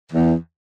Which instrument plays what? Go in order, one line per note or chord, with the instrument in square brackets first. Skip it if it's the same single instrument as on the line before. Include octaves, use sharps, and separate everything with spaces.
[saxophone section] E2